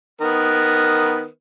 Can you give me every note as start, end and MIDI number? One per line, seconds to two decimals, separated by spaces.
0.21 1.27 51
0.21 1.27 59
0.21 1.27 70